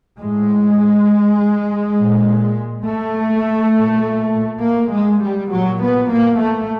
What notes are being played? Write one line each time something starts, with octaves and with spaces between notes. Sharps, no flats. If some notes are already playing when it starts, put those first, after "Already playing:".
A2 G#3
A#2
A3
A#2
A#3
G#3
G3
A#2 F#3
B3
A#3
A3